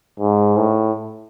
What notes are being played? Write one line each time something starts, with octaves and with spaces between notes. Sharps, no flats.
G#2
A2